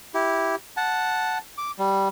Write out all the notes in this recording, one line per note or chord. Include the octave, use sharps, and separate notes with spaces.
E4 G4
F#5 A5
D6
G3